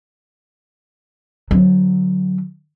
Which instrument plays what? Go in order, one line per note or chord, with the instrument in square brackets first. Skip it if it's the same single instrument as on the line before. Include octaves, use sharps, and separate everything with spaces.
[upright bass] D3 F#3